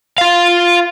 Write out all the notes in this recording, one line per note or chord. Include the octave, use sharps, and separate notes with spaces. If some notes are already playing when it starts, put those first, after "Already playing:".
F4 F5